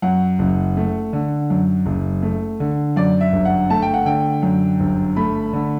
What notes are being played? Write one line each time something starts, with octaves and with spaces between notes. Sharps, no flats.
F#2 F#5
F#1
A3
D3
F#2
F#1
A3
D3
F#2 D5
E5
G1
F#5
A3 A5
G5
F#5
D3 G5
F#2
G1
A3 B5
D3